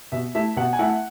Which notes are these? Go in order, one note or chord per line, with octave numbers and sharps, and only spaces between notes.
B2 E5
A3 E4 E5
B2 F#5
G#5
A3 E4 F#5